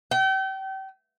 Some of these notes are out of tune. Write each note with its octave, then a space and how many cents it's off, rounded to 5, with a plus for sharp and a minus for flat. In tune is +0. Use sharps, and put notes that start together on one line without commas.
G5 -35